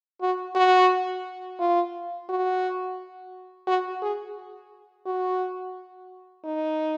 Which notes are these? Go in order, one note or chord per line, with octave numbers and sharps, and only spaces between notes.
F#4
F#4
F4
F#4
F#4
G#4
F#4
D#4